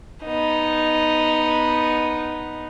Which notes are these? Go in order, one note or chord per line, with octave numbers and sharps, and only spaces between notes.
B3 D#4